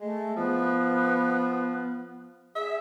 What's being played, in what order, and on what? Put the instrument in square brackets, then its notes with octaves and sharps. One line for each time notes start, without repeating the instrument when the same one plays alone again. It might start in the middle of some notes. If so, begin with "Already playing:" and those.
[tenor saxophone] G#3 [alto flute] A3
[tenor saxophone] F3 [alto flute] B3
[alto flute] G#4 [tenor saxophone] E5